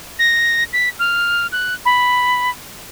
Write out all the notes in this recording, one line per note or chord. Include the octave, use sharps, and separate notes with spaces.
A#6
B6
F6
F#6
B5